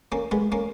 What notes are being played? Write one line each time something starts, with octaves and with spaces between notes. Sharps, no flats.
A#3 C#4
G#3 B3
A#3 C#4